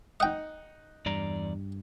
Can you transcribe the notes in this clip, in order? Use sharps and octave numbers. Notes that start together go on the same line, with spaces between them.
D#4 D#5 F#5 G5
E2 G2 D5 A#5